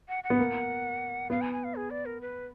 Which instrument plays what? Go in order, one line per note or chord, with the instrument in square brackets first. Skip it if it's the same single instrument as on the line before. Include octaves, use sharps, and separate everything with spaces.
[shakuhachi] F#5
F#5
[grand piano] B3
A#3
[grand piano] B3 [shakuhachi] F5
[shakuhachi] G#5
G#5
F5
G#4
D5
A#4
B4